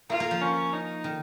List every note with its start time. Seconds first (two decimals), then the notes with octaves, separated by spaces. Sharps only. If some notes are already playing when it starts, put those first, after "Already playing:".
0.10 A#3 F4
0.20 A#3
0.31 F3
0.41 C#4
0.73 D#4
1.04 D#3